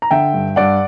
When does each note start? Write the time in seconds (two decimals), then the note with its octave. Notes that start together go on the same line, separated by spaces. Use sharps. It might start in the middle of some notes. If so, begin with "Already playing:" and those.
0.02 A#5
0.11 D3 E5 G5
0.33 G2
0.56 G2 D5 F#5